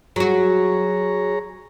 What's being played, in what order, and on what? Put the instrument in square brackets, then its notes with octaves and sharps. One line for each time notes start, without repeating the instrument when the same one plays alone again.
[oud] F#3 F#4 [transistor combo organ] G#4 C#5 A#5